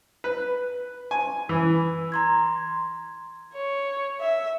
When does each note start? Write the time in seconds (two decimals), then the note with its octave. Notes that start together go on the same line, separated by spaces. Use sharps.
0.24 B4
1.11 G#5
1.49 E3
2.12 A#5 C6 G#6
3.54 C#5
4.21 E5